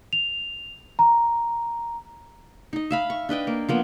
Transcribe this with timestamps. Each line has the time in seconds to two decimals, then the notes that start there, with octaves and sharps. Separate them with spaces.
0.13 F7
0.99 A#5
2.73 D#4 D#5
2.91 E5 F5 B5
3.10 C#6
3.29 D4 B4 D#5 G5
3.47 A#3
3.69 F3 A#3 B3